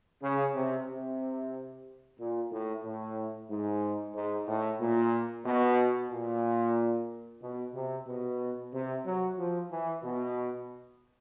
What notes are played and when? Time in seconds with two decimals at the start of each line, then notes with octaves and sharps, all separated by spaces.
0.23 C#3
0.55 C3
0.89 C3
2.19 A#2
2.51 A2
2.84 A2
3.50 G#2
4.15 G#2
4.48 A2
4.80 A#2
5.46 B2
6.11 A#2
7.42 B2
7.74 C3
8.07 B2
8.73 C3
9.06 F#3
9.38 F3
9.71 E3
10.03 B2